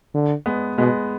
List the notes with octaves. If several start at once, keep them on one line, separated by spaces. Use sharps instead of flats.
D3
G#3 B3
B2 G#3 B3